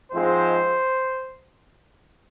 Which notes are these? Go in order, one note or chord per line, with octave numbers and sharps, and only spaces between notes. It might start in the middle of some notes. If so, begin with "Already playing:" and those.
G#2 F3 G#3 C4 C5